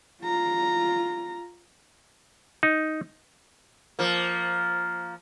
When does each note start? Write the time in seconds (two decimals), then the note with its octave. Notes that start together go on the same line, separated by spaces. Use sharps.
0.23 F4 A#5
2.63 D#4
3.99 F3 A#3